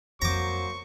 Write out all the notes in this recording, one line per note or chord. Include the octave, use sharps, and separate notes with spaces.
F2 F#3 A#3 C5 A#5 C#6 D6